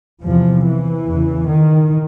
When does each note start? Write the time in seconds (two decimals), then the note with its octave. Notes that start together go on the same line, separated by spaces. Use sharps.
0.23 E2 C3 F3
0.65 E3
1.07 E2 C#3
1.50 D#3